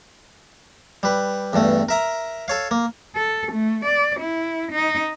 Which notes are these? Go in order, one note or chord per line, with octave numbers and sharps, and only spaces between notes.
G3 B4
E2 G2 A3
A#4 E5 A#5
A4 C#5 F5
A#3
A4
A3
D5
E4
D#4